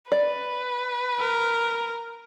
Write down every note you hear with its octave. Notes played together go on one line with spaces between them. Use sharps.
B4 D5
A#4